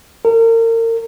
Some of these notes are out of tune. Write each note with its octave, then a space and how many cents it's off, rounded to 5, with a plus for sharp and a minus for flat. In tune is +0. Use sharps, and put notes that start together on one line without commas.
A#4 -35